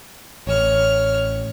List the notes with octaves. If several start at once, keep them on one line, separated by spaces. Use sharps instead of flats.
A1 C#5 F6